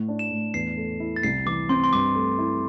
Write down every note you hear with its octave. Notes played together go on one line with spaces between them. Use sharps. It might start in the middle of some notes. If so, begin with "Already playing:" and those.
Already playing: A2
D4
E7
A2
E2 C7
A3
E4
A6
C2 C7
E3 D6
C4 C6
C6
G2 D6
A3
E4